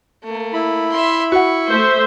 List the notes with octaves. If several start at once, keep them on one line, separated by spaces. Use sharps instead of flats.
A3 A#3
E4 B5
E5 C6
F#4 F#5 C#6
A3 C5 E5